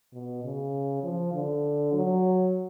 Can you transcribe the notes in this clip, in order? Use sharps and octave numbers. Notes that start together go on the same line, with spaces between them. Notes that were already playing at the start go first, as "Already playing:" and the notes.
B2
C#3
F3
D3
F#3